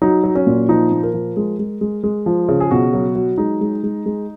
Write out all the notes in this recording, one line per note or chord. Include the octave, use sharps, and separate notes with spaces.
F#3 D#4
F#3
C#4
A#2
F3 D#4
A#2
A#4
F3
G#3
G#3
G#3
G#3
F3
C#3
G#4
B2 F#4
F#3
F#3
G#3 D#4
G#3
G#3
G#3